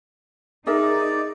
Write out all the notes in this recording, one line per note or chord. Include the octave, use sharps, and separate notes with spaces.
D#4 G#4 A#4 D5 E5